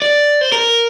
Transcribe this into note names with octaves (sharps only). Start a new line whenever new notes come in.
D5
C5
A#4